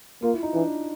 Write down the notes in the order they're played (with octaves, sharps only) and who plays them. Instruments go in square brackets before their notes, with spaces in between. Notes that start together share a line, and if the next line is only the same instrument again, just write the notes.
[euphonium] A#3 [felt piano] F4
[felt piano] E4
D#4
[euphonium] E3 [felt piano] D4